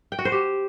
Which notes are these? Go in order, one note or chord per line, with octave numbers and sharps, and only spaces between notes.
G5
F#4
C5
G4